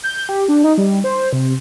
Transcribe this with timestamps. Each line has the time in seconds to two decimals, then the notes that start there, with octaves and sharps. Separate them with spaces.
0.03 G6
0.29 G4
0.48 D4
0.64 D#4
0.78 G3
1.04 C5
1.33 C3